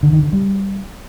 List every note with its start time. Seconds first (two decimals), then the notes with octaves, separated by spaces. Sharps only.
0.03 D3
0.13 D#3
0.23 D3
0.33 G3